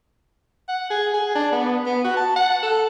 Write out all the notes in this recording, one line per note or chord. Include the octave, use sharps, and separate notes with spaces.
F#5
G#4
G#4
D4
B3
B3
F#4
A5
F#5
A4